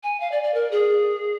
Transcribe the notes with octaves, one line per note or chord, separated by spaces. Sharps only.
G#5
F5
D5
D5
A#4
G#4